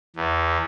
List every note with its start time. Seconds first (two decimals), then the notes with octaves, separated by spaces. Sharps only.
0.16 E2